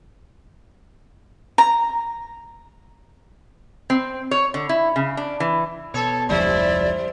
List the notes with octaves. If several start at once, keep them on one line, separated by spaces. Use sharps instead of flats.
A#5
C4
C#5
D3
E4
C#3
D4
E3
B2 A4 C#5
F1 D2 F3 G3 E4 C5 D5